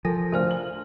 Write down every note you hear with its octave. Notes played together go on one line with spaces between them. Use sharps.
F3 A4 A#4 G#5 A#6
D2 D4 F4 A#4 C5 F6
F#7